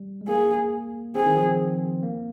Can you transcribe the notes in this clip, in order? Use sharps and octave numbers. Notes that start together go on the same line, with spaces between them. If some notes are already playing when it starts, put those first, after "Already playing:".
Already playing: G3
G#3
A#3 G#4
C4 G#4
D#3
F3
C4
A#3